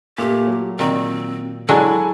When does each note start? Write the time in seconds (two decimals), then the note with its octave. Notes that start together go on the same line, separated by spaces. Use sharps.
0.18 A#2 A3 G4
0.47 F#3
0.79 A#2 D#3 C4
1.69 F#3 G#3 D4 E4 A4 C#5 G#5